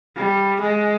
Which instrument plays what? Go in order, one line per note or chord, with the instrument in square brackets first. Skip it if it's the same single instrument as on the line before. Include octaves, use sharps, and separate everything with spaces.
[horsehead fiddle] G3
G#3